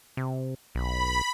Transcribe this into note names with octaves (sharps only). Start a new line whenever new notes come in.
C3
B1 B5